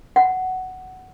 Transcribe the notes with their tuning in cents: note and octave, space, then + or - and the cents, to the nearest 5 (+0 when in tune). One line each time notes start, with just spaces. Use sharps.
F#5 +10